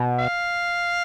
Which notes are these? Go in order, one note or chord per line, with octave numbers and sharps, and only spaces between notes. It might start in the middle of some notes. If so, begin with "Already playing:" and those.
Already playing: B2
F5